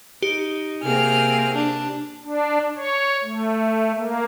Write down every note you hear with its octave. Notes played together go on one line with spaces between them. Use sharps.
D#4 G4
C3 A#3 C4 G#4 F6
D4
D4
C#5
A3
A#3